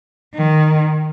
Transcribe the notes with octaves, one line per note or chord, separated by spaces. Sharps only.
D#3